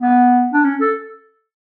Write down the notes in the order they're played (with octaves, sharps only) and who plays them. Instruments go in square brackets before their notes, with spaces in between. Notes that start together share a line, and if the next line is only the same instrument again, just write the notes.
[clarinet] B3
D4
C#4
A4